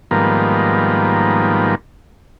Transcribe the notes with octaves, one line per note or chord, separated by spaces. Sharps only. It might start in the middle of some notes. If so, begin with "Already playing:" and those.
G#2 D#3 F3 G3 A#3 B3